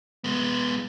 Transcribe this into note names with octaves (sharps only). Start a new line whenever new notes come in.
G#3 B3